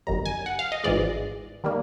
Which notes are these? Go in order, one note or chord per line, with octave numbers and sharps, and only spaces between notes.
G1 F#2 D#3 G3 A#5
G#5
F#5
F5
D#5
G#1 G#2 E3 G#3 D5
D#3 G3 A#3